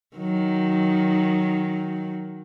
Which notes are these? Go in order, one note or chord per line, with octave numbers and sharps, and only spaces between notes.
D#3 F#3